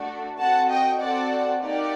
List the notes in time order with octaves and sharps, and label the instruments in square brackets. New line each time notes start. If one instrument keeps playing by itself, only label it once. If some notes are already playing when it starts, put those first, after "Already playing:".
Already playing: [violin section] A3 D4 F#4 A4
C4 F#4 A4 F#5 A5
D#5 G5
C4 F#4 A4 D5 F#5
A#3 D#4 G4 D5 F#5